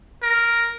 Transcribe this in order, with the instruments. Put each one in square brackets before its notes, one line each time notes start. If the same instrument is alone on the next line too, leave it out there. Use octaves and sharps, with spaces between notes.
[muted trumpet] A#4